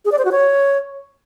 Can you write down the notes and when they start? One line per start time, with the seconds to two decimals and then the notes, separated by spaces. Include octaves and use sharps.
0.05 G#4
0.12 D5
0.18 C5
0.25 F#4
0.32 C#5